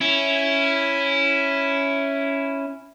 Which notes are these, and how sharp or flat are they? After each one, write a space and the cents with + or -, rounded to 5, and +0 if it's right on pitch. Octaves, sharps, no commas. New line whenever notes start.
C#4 +0 E4 +0